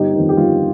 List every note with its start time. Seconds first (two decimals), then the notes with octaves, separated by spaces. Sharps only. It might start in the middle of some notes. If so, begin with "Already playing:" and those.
Already playing: G1 D#4 G4
0.15 F2 D#3
0.29 G4
0.37 G1 F4